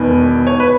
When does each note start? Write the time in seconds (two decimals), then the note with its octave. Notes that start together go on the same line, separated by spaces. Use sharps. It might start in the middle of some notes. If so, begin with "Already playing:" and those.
Already playing: E1 E2 D#3 B4
0.47 C#5
0.60 B4